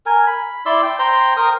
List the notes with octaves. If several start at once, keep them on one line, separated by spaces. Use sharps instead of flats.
A#4 G#5
B5
E4 D5 C6 E6
G5
C5 G5 A#5 C6
A#4 G5 D#6